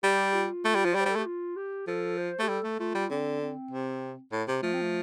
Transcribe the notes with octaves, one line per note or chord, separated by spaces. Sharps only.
G3 G4
F4
A3
G3
F3
G3 D5
C5
G3
A4
A3
G4
F4
G4
F3 A4
C5
A3 G4
G3 A4
A3
A3 F4
G3
D3 C4
C4
C3
A2
C3
F3 A3
C4
A3